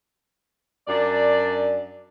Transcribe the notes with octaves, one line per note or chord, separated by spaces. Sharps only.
F#2 D4 D5